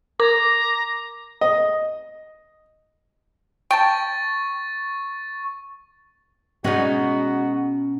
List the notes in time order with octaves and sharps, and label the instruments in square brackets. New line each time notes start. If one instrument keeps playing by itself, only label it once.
[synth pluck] A#4 [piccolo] A#5 [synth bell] D6
[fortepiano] D#5
[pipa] G5 A5 [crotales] C#6 A6
[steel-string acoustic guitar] B2 C#4 F#5 [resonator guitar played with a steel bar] G#3 B3 D#4 [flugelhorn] F#4